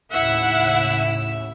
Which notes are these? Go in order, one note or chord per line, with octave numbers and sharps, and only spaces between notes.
D#2 A2 C#3 E4 E5 F#5